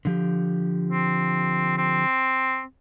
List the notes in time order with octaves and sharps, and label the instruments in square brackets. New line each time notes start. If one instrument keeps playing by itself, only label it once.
[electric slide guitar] D3 F3 G4
[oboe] C4
C4